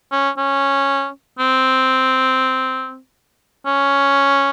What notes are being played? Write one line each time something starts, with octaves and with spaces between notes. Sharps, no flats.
C#4
C#4
C4
C#4